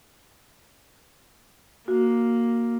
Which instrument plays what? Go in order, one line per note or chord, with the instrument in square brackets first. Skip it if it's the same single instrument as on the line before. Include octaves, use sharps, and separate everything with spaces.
[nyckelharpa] A#3 [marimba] F#4